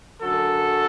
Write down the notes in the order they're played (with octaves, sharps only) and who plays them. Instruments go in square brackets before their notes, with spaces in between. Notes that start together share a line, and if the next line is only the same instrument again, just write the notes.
[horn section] F#2 D3 F#3 A4